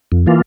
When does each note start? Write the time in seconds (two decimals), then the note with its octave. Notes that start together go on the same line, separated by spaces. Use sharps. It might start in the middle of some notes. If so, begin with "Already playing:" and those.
0.12 F2
0.27 E3 A#3 F4